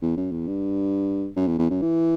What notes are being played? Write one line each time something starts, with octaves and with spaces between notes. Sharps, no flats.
E2
F#2
E2
G2
F#2
E2
E2
F#2
E3